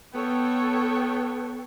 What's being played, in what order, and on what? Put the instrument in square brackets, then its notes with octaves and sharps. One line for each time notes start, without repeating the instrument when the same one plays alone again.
[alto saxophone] B3 [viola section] A4 C#5 G5